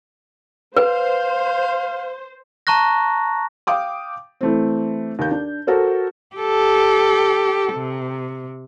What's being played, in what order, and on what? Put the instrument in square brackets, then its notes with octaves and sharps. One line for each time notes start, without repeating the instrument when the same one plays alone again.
[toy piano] B4 [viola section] C5 [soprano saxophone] F5
[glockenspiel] A5 A#5 C#6 F#6 A#6
[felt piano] F5 G5 D6 D#6
E3 A3 C4
D#2 G6
D4
F#4 A4 A#4 C5
[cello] G4 A4
C3